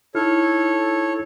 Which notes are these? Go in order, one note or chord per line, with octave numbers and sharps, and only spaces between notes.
D#4 E4 A4 C#5 F6